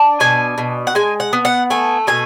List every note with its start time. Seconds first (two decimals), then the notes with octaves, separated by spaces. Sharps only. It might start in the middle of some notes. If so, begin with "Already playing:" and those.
Already playing: D4
0.20 B2 G#5
0.58 B2
0.87 F#5
0.95 G#3 G#5
1.20 F#5
1.33 B3
1.45 F#5
1.70 A3 G#5
2.07 B2 G#5